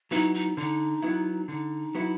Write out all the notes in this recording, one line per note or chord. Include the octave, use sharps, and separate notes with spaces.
F#3 B3 D#4 E4
D#4
D3 D#4
F#3 B3 E4
D3 D#4
F#3 B3 E4